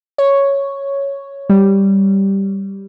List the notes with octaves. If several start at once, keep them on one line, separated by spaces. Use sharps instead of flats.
C#5
G3